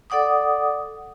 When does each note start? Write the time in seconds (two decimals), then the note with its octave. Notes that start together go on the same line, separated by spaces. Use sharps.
0.10 A4 D5 F#5 D6 D#6